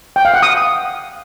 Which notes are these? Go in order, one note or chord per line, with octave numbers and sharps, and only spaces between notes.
G5
F5
F#5
D#6